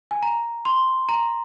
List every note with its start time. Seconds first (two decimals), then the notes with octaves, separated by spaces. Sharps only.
0.11 G#5
0.23 A#5
0.65 C6
1.09 A#5